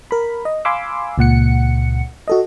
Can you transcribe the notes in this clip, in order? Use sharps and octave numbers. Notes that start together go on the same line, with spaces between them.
A#4 B5
D#5
F5 G#5 B5 C6 D6 E6
C#2 A#2 F#5 C#7
F#4 A4 D#5